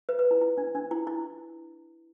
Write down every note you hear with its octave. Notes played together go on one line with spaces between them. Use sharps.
B4
B4
E4
E4
D4
D4
E4
E4